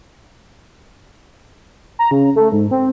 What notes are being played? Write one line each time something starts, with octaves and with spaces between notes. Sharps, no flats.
A#5
C#3
A3
G#2
C4